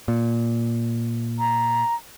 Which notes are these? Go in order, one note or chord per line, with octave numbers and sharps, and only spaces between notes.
A#2
A#5